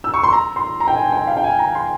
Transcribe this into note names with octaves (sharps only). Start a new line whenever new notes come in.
E6
C#6
C6
A#5
C6
A#5
G5
G#5
G5
F5
G5
G#5
A#5
C6